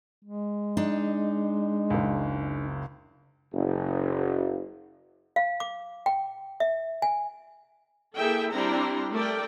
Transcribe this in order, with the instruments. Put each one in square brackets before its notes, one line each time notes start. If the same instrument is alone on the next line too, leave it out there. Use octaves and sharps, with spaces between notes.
[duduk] G#3
[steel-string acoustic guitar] D4 D#4
[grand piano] F#1 C#2
[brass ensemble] F#1
[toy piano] F5
D6
G5
E5
G#5
[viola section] A#3 E4 G#4 A4 E5 G5
G3 C4 D4 E4 A#5 C6
A3 A4 A#4 D5 G5